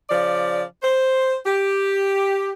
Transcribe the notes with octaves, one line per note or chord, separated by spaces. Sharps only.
C#3 F3 D5
C5
G4